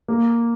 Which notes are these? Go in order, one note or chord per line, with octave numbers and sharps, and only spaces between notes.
A#3